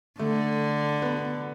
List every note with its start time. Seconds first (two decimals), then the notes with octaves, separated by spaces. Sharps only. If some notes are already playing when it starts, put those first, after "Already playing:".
0.19 D3 A3
1.02 B3